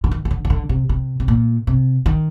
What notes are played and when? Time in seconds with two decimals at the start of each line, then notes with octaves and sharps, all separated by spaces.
0.04 D3
0.11 D#3
0.25 D#3
0.31 D3
0.45 D#3
0.50 D3
0.69 C3
0.89 C3
1.20 C3
1.28 A#2
1.67 C3
2.06 D#3